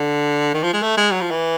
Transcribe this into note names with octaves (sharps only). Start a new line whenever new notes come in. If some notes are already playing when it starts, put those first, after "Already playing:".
Already playing: D3
D#3
F3
G#3
A3
G#3
F#3
F3
E3